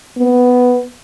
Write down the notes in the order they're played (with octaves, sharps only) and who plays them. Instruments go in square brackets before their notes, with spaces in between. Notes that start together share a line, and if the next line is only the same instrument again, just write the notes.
[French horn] B3